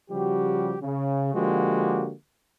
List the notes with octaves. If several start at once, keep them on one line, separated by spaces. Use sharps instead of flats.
C#3 F3 G3 F#4 G4
C#3
D3 F3 G#3 A#3 F#4 G4